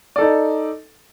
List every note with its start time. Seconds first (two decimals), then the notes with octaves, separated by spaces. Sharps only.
0.16 D5
0.18 A4
0.21 D#4